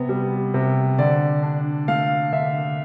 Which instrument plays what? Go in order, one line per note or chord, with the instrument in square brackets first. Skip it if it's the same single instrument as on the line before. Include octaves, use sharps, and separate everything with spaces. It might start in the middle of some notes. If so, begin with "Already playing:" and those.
Already playing: [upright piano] C3 B3
G3
C3
D3 D5
D4
A3 F5
D3 E5